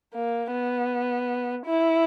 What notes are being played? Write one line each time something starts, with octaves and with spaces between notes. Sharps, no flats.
A#3
B3
E4